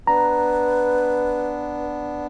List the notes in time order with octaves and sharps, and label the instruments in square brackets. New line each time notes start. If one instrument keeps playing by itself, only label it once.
[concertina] B3 D4 [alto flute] B4 [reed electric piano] A#5